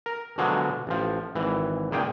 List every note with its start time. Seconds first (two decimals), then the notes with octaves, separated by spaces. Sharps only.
0.06 A#4
0.38 B2 D3 F3 F#3 G#3
0.87 A1 F3
1.35 G#1 E3
1.91 C#2 A#2 G#4 G5